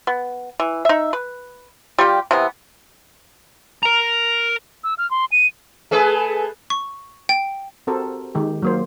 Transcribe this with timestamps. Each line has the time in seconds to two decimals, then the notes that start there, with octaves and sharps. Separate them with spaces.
0.07 B3
0.60 E3
0.85 D#4 E5
1.13 B4
1.98 G3 F4 G4
2.31 C3 E3 B3
3.83 A#4 A#5
4.84 E6
4.98 F6
5.11 C6
5.32 D#7
5.91 A3 G#4 B4
6.70 C#6
7.29 G5
7.87 C4 F#4 G4 A4 A#4 C5
8.35 D#3 G#3 G4
8.62 F#3 A#3 C5